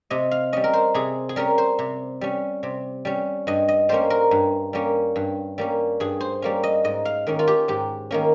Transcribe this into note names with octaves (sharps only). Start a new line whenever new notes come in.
C3 D#5
F5
G3 C#4 D#5
A#4
C5
C3 G#4
G#4
G3 C#4 A#4
C5
C3
G3 C#4
C3
G3 C#4
G2 D#5
D#5
G3 A#3 C#4 C5
A#4
G2
G3 A#3 C#4
G2
G3 A#3 C#4
G2 G#4
C5
G3 A#3 C#4
D#5
G#2 D#5
F5
D#3 A#3 C#4
F4
G4
G#2 G4
D#3 A#3 C#4